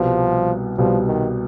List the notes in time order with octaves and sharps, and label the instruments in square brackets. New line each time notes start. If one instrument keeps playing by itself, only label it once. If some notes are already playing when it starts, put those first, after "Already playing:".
Already playing: [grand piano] C2 B2 G3 [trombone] F3
[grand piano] C2 B2 G3 [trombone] F3
[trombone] D#3